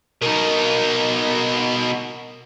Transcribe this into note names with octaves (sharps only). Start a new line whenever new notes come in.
B2 D#4 A#4 A#5